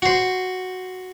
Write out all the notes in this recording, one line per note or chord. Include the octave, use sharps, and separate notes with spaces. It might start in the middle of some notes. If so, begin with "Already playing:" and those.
F#4 C5